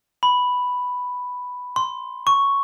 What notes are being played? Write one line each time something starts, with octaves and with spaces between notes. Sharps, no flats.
B5
C6
C#6